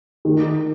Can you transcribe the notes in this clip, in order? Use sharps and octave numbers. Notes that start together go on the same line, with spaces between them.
D#3